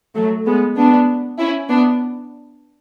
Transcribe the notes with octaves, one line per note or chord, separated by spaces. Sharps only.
F#3 A3
G#3 B3
B3 D4
C#4 E4
B3 D4